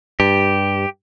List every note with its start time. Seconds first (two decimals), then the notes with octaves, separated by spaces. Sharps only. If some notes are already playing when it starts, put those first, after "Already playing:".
0.20 G2 G4